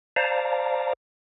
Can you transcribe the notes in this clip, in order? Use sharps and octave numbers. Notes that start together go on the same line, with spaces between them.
C5 D5 F5 A5 A#5